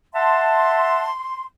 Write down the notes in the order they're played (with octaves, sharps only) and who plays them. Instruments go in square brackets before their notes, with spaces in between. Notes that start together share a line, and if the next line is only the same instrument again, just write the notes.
[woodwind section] E5 F#5 A5 [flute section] C6